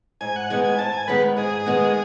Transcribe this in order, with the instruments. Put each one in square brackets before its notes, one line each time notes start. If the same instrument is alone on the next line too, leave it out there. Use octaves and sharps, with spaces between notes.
[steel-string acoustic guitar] G#2 [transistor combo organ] G#5
[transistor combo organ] F#5
[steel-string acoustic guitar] D#3 G#3 B3 [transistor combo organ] G#5
[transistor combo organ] G#5
[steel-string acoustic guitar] G#2 [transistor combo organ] A5
[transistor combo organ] G#5
[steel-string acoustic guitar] D#3 G#3 B3 [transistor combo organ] B4
[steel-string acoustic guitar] G#2 [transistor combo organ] G#4
[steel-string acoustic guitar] D#3 G#3 B3